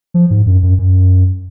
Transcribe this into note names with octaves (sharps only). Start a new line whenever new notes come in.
F3
G#2
F#2
F#2
F#2